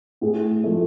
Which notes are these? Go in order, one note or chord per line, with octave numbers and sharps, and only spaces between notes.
A2 G#4
F3 A3